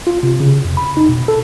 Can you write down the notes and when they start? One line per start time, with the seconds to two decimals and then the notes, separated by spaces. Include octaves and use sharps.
0.07 F4
0.23 C3
0.40 C#3
0.65 F2
0.77 B5
0.97 D#4
1.09 B2
1.28 A4